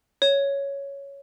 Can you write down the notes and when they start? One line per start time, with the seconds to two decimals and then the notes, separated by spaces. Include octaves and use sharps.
0.22 C#5